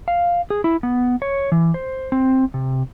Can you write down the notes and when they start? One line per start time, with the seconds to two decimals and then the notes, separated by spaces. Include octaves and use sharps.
0.08 F5
0.50 G#4
0.64 E4
0.83 B3
1.22 C#5
1.52 E3
1.74 C5
2.12 C4
2.54 C3